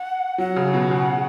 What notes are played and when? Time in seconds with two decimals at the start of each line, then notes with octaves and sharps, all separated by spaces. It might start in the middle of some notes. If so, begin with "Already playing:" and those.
Already playing: F#5
0.38 F#3 F#5
0.56 C#3
0.74 B2
0.91 C#3